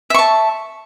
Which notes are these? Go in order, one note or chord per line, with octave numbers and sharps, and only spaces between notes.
E5 A5 C#6